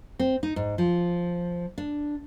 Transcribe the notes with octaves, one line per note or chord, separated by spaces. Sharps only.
C4
D#4
G#2
F3
D4